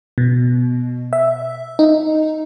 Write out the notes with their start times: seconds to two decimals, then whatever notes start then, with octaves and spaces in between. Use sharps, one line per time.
0.18 B2
1.13 E5
1.79 D#4